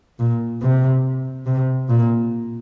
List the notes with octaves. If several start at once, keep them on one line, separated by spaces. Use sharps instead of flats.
A#2
C3
C3
A#2